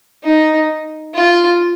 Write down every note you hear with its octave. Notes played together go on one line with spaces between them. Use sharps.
D#4
F4